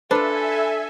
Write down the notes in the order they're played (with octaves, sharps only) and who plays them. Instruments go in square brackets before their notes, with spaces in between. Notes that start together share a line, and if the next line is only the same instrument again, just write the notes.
[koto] D4 F4 [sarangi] A4 [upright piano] B4 [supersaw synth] E5 G#5